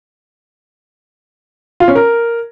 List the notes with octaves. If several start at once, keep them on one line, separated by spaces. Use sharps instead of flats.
F4
C#4
A#4